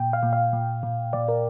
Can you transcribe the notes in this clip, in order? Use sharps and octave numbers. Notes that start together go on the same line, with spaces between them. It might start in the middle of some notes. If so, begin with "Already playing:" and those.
Already playing: A#2 G5
F5
A#2
F5
A#2
A#2
A#2 D5
A#4